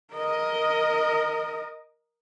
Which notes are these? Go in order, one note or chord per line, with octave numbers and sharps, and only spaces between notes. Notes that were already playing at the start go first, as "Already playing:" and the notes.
A#4 D#5